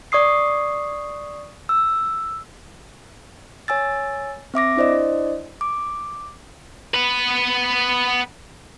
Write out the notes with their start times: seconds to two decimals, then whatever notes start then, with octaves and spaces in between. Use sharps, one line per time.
0.12 D5 C#6 D#6 C7
1.69 E6
3.68 C#5 G#5 E6 A6
4.54 C4 E5 D6 A#6
4.76 D4 E4 C5 D5 D#5
5.61 D6
6.94 B3 B4